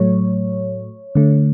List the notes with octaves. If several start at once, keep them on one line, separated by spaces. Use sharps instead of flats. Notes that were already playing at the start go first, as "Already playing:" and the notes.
Already playing: A2 F#3 A3 C#5
D3 A3